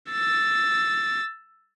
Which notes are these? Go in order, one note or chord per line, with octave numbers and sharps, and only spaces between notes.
E6 A6